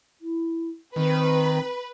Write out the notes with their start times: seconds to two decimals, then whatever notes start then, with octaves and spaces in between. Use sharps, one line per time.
0.21 E4
0.96 D#3 C4 B4